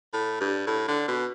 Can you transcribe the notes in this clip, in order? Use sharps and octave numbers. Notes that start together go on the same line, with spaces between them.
A2
G2
A2
D3
B2